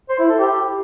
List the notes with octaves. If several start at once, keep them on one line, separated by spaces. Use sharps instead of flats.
C5
E4
A4
G4